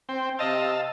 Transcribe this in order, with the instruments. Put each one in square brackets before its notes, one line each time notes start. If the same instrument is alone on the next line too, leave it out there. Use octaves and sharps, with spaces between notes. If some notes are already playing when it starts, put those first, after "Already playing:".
[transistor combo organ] C4 G5
[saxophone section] C3 D#5 [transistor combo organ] F5 A5 E6